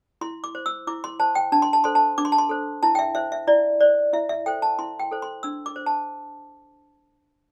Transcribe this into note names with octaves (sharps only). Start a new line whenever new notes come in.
E4 C6
D6
C5
E6
E4 D6
C6
C5 A5
G5
D4 A5
C6
A5
A4 C5 C6
A5
D4 D6
C6
A5
C6
A4 C5
E4 A5
G5
E5
C5 E5
E5
E4 D5
C5 D5
E4 E5
E5
A4 C5 G5
A5
E4 C6
G5
A4 C5
C6
D4 E6
D6
C5
A5